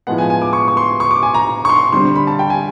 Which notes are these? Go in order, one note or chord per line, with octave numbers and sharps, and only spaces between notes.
A2 F3 G#3 B3 F#5
G#5
G#5
D6
C#6
C#6
C6
C#6
D6
G#5
A#5
C#6
C6
D3 G3 C4 C6
B5
A5
G5
G#5